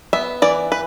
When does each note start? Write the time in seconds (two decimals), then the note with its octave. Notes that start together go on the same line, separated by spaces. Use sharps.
0.13 B3 E5
0.42 E3 D5
0.72 B4